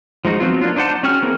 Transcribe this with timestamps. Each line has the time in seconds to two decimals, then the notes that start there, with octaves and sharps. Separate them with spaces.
0.25 F3 G#3 D#4 F#4
0.40 F3 F#3 B3 C4 F4
0.61 A#3 D4 F4
0.76 D4 D#4 C5 F#5 A5
1.03 C#4 F#4 G#4 G5 F6
1.22 E3 A#3 C4 G#4 A#4